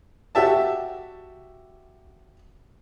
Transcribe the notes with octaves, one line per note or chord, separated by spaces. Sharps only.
F#4 G4 E5 A5